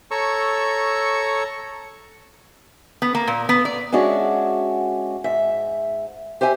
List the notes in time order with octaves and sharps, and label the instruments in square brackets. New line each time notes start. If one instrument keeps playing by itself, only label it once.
[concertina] A4 C#5 A#5 C#6 E6
[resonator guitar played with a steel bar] B3
A#3
A#2
B3
D5
[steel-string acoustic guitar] G#3 C#4 D4 F#4 G#4 E5
G#2 E5
G4 C5 E5 G#5